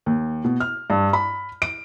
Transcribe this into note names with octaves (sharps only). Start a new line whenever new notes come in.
D#2
B2
F6
G2
B5
D7